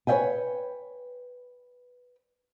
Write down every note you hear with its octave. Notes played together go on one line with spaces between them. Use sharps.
B4 C#5 D5 E5 G5 G#5